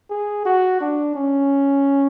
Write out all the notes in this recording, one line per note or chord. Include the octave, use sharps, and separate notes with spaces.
G#4
F#4
D4
C#4